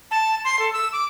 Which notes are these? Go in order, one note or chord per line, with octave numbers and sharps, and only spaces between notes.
A5
C6
A4
E6
D6